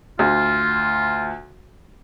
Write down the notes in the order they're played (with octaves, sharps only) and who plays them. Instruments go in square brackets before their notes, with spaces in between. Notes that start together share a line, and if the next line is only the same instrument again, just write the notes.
[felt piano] D2 [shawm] F4